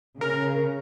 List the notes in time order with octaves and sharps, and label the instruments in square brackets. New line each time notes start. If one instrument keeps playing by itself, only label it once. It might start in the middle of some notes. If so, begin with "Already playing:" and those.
[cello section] C#3 [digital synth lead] A#4